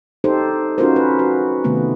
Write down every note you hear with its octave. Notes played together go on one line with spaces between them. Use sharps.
D#4 G4 A4 C5
C#4 D#4 F4 F#4 A#4 C5
B4
F#4
C3 D#3 A3 B3